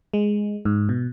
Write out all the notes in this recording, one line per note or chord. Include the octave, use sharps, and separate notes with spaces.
G#3
G#2
B2